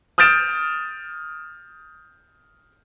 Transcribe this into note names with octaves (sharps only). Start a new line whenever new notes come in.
D#6 F6 G6 A6 D7 E7